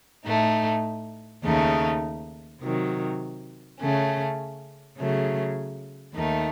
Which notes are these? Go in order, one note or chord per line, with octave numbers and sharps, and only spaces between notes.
A2 A3 D#4
D#2 C#3 A3 D#4
C3 D#3 F#3
C#3 A3 C#4
C#3 F#3 A3
D#2 D#3 A3 D#4